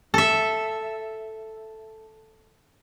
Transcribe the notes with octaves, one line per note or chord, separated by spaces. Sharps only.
A4 E5